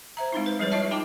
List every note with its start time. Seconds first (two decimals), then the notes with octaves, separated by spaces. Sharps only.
0.17 C5 E5 A#5
0.33 G#3 C4 D#4 E4
0.46 B4
0.59 F3 G3 G#4 B4 C#5
0.71 E4 F4 C#5 D#5 E5 A5
0.91 D#4 F4 G#4 G5 A5 D6